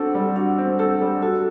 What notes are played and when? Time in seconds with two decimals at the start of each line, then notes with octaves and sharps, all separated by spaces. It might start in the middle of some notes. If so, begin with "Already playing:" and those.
Already playing: C4 D4 F#4 A4
0.14 G3
0.36 D4 F#4
0.58 C4
0.79 G4 A4
1.01 G3
1.22 F#4 A4